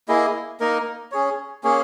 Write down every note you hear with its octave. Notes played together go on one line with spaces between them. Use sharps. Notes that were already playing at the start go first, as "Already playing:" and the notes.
A#3 E4 G#4 D#5
A#3 D#4 A#4 D#5
C#4 G#4 C#5
A#3 C#4 G#4 C#5